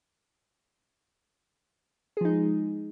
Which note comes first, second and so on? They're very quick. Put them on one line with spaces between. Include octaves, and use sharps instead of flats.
G#4 F3 D#4 G#3